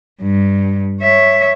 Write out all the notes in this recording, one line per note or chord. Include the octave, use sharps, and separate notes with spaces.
G2
C#5 E5